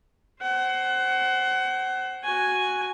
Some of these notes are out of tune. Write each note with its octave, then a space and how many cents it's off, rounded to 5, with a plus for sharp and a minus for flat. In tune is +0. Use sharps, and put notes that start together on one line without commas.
C5 +10 F#5 +25
F#4 +0 G#5 +0